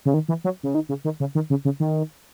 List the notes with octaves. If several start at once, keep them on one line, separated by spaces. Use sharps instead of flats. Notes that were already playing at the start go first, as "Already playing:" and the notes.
C#3
D#3
E3
F#3
C#3
D#3
C#3
D#3
C#3
D#3
C#3
C#3
D#3